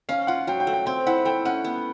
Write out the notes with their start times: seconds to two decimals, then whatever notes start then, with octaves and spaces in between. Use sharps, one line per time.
0.09 C#4 F5
0.27 F4 F#5
0.47 F#3 G5
0.60 G5
0.67 A3
0.73 G5
0.86 C4 G5
1.06 E4 F#5
1.25 A3 G5
1.45 C#4 F#5
1.65 B3